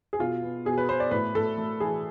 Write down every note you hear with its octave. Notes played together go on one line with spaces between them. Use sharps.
G#4
B2 F4
B3
B2 G#4
B4
B3 C5
D5
A2 B4
A2 A4
A3
E3 G#4